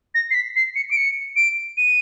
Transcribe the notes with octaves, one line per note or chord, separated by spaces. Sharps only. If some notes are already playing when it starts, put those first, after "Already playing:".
A#6
C7
B6
C7
C#7
D7
C#7
D7
D#7